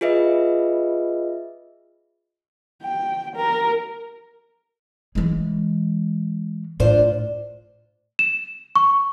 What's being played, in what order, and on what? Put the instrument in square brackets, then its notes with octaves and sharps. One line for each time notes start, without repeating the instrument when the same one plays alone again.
[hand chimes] F4 G#4 B4 D#5 E5
[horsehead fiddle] G5
A#4
[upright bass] E3 G#3
[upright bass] A2 [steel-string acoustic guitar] D4 F4 C5
[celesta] E7
C#6